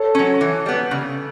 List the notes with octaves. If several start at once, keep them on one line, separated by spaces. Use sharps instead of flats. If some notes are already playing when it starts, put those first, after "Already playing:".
Already playing: A4 C#5
F#3 C#4
E3
G3 B3
C#3